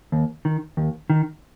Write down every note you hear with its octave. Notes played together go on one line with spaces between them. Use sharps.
D#2
D#3
D#2
D#3